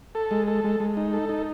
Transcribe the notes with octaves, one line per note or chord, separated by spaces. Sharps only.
A4
G#3
A4
G#3
G#3
D#4
A4
D#4